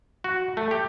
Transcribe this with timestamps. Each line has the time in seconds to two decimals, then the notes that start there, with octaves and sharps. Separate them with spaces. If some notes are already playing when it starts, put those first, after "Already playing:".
0.24 F#4
0.57 A3
0.71 G4